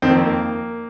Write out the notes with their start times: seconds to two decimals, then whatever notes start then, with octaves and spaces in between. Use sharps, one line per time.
0.02 F2 D#3 C4
0.10 A#3
0.25 A#3